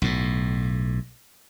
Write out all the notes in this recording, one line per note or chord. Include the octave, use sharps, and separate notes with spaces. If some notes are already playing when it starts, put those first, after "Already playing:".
B1 A2